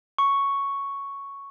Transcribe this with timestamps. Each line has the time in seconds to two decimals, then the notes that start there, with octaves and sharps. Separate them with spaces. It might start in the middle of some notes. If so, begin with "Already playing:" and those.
0.18 C#6